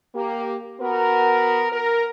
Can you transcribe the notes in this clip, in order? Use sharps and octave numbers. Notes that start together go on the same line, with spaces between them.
A#3 G4
B3 F#4 A#4
A#4